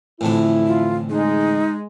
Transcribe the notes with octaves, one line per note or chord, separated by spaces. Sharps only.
A1 F2 D3 E4
F4
G#3 D#4